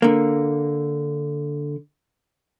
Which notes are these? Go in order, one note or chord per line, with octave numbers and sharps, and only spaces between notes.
D3 A#3